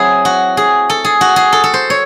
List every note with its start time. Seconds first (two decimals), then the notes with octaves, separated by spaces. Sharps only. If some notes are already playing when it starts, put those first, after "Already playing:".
Already playing: F#3 C4 E4 G#4
0.25 F#4
0.57 G#4
0.90 A4
1.05 G#4
1.21 F#4
1.36 G#4
1.52 A4
1.64 A4
1.74 C5
1.90 C#5